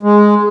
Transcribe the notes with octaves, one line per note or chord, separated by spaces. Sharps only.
G#3